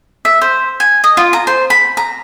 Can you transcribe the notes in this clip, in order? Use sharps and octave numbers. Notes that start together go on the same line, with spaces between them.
E5
C5
G#5
D#5
F4
A#5
C5
B5
A#5